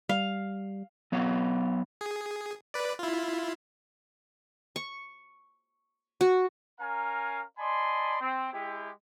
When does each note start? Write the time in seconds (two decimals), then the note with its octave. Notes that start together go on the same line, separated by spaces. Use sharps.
0.09 G3 F5
1.12 F#3 B3 C#5 F5
2.01 G#4
2.74 B4 D5
2.99 E4 F4
4.76 C#6
6.21 F#4
6.79 C#4 A#4 F5 G#5 A#5
7.58 D5 D#5 G#5 A5 B5 C6
8.20 C4
8.53 G#3 E4 G4